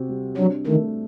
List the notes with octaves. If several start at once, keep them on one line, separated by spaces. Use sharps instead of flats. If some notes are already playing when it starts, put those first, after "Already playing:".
Already playing: C3 C4 F#4
G3
F#3 D4
D#3 A3